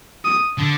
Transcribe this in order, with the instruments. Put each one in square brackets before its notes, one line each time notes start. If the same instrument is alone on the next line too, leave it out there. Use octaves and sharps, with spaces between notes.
[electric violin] D#6
[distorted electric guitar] D3